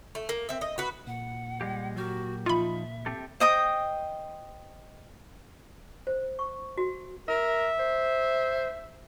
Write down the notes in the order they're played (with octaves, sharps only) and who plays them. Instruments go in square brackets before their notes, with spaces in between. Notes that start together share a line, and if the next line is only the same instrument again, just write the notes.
[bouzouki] A3
A#3
C4 E5
D#5
F#4 B4
[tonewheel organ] A#2 [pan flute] F#5
[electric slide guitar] G3 G#3 G4
[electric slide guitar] F#3 G4 A#4 [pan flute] F#4
[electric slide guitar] F3 D#4 [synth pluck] F4 B5 [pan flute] E5
[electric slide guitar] C4 G4 A4
[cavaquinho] C5 D#5 G5 D#6
[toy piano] C5
C#6
F#4
[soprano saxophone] A#4 [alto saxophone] E5
[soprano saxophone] C5